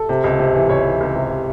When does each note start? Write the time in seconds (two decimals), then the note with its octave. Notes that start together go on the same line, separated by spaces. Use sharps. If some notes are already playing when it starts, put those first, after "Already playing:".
Already playing: A4
0.09 C3
0.24 C#2
0.39 C3
0.54 E3
0.69 C#2 C#5
0.85 E3
1.01 C#2
1.15 C3